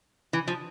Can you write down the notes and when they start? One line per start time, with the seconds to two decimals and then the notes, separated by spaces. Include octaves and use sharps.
0.33 E3
0.48 F3